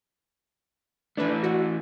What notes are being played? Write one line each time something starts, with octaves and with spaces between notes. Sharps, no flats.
E3 A3 D4 B4
F#4